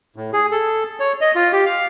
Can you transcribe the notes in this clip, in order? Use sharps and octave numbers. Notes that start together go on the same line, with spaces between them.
A2
G#4
A4
C#5
D#5
F4
G4
F5